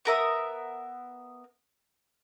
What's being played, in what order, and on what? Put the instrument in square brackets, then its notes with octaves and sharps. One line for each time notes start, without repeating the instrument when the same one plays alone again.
[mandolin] B3 A#4 E5 D#6